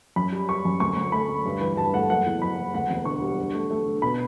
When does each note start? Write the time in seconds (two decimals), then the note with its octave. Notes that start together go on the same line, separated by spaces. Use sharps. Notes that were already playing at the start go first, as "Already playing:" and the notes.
0.16 F#2 B5
0.32 G3
0.48 G3 C#6
0.65 F#2
0.80 D2 C#6
0.96 D2
1.12 A3 B5
1.29 D2
1.45 G2
1.61 E3
1.77 G2 A5
1.94 A3 F#5
2.10 F#1 F#5
2.26 E2
2.42 F#3 B5
2.58 F#1
2.74 D2 F#5
2.90 E1
3.05 D3 C#6
3.21 G3
3.39 D3
3.55 A3
3.71 A3
3.86 D3
4.02 B2 B5